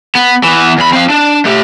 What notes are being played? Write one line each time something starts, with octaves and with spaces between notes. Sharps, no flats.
B3
E3 B3
E2 B5
C4 F5
D4
A3 G4